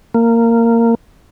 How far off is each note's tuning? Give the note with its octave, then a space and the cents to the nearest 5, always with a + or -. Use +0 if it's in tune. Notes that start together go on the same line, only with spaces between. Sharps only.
A#3 -15